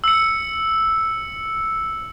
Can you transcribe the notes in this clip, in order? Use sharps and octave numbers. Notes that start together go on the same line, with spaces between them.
E6 C#7